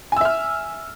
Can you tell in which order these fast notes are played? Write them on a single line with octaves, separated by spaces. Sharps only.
G#5 E6 E5 F6